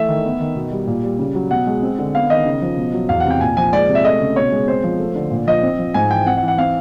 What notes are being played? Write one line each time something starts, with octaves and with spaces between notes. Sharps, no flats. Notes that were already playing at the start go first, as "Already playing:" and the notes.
Already playing: E3 A3 E5
D#3
B3
D#3
B2
G3
A#2
G3
C#3
F#3
B2 F#5
G#3
C4
D3
B3 F5
D#3 D#5
C#3
F3
B2
F#3
E2 F5
F#5
C3 G5
A#2 G#5
F3 G#5
G#3 D5
C3
E5
A3 D#5
C#3
B2 C#5
G#3
C4 C5
F3
A3
D3
A#2
F3 D#5
C4
F3
G#2 G#5
E3 G5
C4 F#5
F#5
E3
F#5
C4 F5